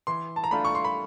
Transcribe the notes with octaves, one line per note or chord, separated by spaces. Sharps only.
E3 C6
A5
A#5
A3 D4 F4 B5
C#6
C6
B5